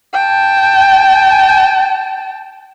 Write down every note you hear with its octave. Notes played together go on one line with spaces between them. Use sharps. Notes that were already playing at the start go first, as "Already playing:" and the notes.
G5 A5